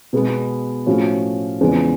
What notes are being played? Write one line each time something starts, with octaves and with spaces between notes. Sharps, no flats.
B2 G#3 B3
A2 F3 A3 C#4 F#4
E2 C#3 F3 G#3 B3